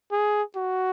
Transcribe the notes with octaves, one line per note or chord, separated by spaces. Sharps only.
G#4
F#4